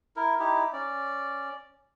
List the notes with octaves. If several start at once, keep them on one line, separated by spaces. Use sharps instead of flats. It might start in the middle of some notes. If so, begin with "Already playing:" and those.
E4 A#4
D#4 E4 G4
C#4 D5